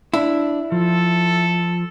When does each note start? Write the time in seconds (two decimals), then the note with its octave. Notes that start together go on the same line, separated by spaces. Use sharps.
0.14 D4 E4
0.72 F3 A4